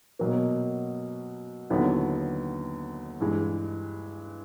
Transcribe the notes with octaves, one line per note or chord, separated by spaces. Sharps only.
B2 F#3 A#3
D#2 D3 F#3 B3 E4
G2 E3 G#3